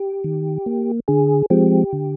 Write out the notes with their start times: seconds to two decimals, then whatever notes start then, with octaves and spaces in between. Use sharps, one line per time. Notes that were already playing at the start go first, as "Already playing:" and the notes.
Already playing: G4
0.24 D#3
0.66 A#3
1.08 D3 G#4
1.50 F3 G#3 C4 G4
1.93 D3